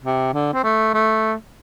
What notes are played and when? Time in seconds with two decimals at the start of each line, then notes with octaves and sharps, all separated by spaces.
0.04 C3
0.34 D3
0.53 C4
0.64 A3
0.94 A3